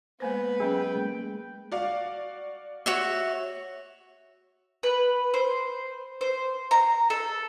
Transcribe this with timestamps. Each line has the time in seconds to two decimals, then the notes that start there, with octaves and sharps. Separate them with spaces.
0.20 G#3 A#3 B3 B4 C5
0.60 F#3 C#4 G#4 G5
0.96 G#3 A#3
1.72 F#4 D5 F5
2.86 F#4 C#5 E5
4.83 B4
5.34 C5
6.21 C5
6.71 A#5
7.10 A4